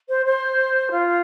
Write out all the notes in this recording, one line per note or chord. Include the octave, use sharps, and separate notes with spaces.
C5
C5
F4